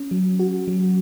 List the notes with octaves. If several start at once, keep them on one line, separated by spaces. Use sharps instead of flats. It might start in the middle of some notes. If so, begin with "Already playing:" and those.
Already playing: C#4
F#3
F#4
F#3